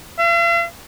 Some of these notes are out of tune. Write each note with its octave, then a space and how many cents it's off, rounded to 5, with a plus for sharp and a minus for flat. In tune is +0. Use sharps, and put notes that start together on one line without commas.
F5 -45